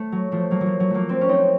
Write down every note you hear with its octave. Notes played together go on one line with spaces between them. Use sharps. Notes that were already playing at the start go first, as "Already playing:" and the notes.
Already playing: A3
F#3
F3 A3
F#3 A#3
F#3
F3
F#3
F#3 A3 A#3
A3 C4
C#4
C4 D#4